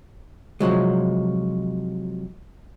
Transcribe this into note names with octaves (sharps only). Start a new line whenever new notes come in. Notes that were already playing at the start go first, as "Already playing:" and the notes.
C3 F3 F#3 G#3